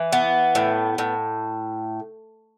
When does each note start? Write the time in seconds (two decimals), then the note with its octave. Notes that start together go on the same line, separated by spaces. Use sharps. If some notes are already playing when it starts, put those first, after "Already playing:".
Already playing: E3
0.12 B3
0.55 A2
0.98 A2